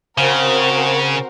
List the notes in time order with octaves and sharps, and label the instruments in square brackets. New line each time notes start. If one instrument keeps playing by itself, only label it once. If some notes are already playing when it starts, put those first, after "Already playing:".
[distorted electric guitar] C#3 [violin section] C4 F#4 A#4